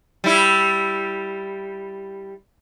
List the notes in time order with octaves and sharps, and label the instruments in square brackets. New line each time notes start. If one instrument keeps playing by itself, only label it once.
[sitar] G3 E4